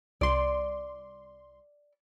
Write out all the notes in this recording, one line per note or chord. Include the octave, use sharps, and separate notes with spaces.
C2 D5 C6